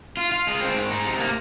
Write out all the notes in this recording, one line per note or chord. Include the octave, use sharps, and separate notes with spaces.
F4
F4
G#3
C4
G#2
D#4
C3
A#3